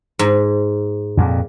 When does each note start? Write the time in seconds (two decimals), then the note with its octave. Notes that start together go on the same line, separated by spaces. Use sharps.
0.19 G#2
1.17 F2 A#2